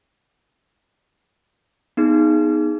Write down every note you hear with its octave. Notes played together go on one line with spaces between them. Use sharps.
B3 D#4 G#4